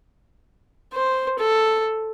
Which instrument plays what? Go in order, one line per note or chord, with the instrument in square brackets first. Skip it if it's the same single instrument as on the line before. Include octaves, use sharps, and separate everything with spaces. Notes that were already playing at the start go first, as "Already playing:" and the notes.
[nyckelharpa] C5
A4